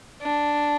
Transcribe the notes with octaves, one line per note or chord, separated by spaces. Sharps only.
D4